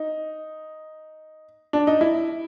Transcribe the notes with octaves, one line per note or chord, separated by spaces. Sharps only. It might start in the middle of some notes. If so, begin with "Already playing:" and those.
Already playing: D#4
D4
D#4
E4